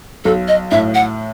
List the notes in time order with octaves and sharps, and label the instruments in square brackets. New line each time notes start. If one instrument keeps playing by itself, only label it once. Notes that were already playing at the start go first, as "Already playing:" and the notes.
[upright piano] B1 [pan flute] A4
[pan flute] D#5
[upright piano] A2 [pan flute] E5
[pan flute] F#5